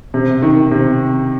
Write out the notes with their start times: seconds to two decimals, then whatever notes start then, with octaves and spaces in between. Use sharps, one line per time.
0.14 C3
0.42 D#3
0.71 C3